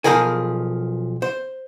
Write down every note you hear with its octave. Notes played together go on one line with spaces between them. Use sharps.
B1 D#3 F3 G#4 A#4 G#5
C5